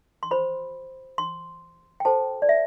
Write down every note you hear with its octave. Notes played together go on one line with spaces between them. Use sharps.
C6
F#4 C5 B5
C6
G5
F#4 A4 C5 A5
D5
E5